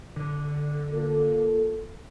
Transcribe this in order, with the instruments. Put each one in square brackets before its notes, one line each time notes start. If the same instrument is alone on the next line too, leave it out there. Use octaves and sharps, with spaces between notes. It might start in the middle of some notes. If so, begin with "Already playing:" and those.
[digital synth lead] D3
[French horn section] A#3 F4 A4